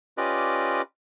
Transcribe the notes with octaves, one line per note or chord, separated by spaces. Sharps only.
C#4 F4 G4 B4 D5 D#5